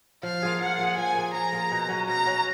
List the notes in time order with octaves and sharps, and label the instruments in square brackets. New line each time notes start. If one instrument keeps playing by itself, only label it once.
[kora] F3 [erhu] F5
[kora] A#3 F4 G#4
[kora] F3 [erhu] F#5
[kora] A#3 F4 G#4
[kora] F3 [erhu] G#5
[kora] A#3 F4 G#4
[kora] F3 [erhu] A#5
[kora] A#3 F4 G#4
B2
F#3 C#4 F#4
[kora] B2 [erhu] A#5
[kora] F#3 C#4 F#4